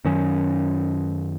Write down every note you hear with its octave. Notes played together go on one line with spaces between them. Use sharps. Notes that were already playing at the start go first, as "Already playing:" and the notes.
F#2 D#3 F#3 C#4